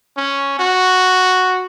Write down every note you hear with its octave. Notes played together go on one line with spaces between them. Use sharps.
C#4
F#4